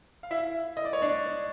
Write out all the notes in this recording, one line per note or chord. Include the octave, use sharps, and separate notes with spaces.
F5
E4 E5
D#5
D5
C#5
D4 D5